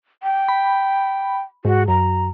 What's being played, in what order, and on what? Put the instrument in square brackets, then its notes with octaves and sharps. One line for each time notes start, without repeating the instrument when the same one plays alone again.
[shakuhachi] G5
[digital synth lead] B5
[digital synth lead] G#2 [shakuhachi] F#4
[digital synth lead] F#2 [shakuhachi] A#5